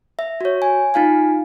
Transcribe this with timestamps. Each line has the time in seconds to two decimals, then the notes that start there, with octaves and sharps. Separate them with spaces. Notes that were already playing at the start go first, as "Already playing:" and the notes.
0.19 E5
0.41 F#4 C#5
0.62 G#5
0.94 D#4 F4 F5 G#5